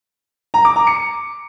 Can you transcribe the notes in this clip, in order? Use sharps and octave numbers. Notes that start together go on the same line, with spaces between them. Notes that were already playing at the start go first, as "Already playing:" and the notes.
A#5
D6
A#5
C#7